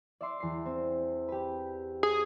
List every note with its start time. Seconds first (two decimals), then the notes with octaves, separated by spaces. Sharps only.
0.21 D5 E5 C6
0.40 E2 C7
0.65 C4
1.28 G4 B4
2.03 G#4